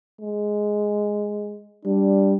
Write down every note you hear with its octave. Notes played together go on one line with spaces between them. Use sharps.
G#3
G3 D4